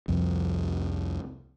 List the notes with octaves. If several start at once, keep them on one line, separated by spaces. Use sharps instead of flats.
C2 F2